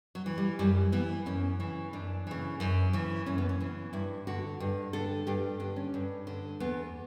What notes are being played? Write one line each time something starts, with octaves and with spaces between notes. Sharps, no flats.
F#3
E3
G3
F#2 G3
E3 B3
F#2 C#4
C#3 E3
F#2 D4
C#3 E3
F#2
C#3 E3
F#2 C#4
B3
C#4
C#3 E3
G2 E4
D3 F#4
G2
D3 A4
G2 G4
D3 D4
C#4
G2
D3
E2 B3